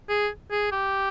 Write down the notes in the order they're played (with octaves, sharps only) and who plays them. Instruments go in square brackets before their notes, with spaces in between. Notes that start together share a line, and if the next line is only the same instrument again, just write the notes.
[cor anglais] G#4
G#4
G4